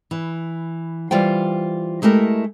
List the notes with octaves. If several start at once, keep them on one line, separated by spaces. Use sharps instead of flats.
E3
E3 G3 F4 C5 G5
G#3 A3 E4 G4 A#4